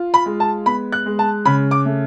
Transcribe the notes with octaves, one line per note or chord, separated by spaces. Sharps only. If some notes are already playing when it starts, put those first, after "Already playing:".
Already playing: F4
B5
G#3
A5
B3 B5
F#6
G#3
A5
C#3 B5
D6
A3